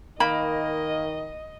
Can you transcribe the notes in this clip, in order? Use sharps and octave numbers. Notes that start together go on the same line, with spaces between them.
D#3 A#3 D#5 B5